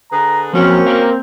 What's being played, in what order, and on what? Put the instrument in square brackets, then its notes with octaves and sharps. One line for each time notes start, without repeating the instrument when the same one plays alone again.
[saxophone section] D3 G#4 B4 [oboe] A#5
[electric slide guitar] F3 F#3 A#4 [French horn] A#3 [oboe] C4 [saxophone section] C#4 F#4
[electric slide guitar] A#4 F5